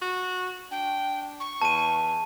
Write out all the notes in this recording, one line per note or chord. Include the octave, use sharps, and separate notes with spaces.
F#4
D4 G5
C#6
E2 A5 D#7